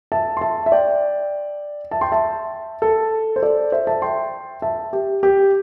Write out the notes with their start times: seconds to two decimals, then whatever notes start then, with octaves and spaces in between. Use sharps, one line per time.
0.12 E5 A5
0.37 C6
0.41 E5 A5
0.66 E5
0.72 D5 G5
1.91 E5 A5
2.01 G5 C6
2.12 E5 A5
2.82 A4
3.36 C5
3.42 A4 D5
3.72 C5 E5
3.87 E5 A5
4.02 G5 C6
4.62 E5 A5
4.93 G4
5.23 G4